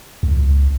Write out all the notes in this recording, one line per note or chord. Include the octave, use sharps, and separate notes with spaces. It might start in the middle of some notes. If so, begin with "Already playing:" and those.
C#2